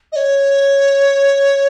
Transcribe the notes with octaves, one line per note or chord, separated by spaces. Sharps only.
D#5
C#5